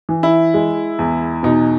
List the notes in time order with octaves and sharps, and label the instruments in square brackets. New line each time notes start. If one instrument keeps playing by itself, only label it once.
[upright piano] E3
[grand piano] E4
[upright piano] G#3
E2
[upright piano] B2 [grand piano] D#4